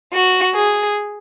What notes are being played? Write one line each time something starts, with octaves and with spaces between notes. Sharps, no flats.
F#4
G#4